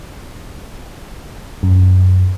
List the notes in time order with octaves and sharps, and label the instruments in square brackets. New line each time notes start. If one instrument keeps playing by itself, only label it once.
[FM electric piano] F#2